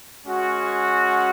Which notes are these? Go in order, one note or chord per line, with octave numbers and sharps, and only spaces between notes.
G#3 C#4 F#4